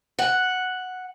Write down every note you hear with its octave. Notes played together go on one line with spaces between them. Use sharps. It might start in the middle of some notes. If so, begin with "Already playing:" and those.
F#5